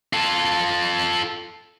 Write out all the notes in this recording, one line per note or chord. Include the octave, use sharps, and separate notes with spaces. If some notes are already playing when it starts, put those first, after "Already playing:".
F4 A4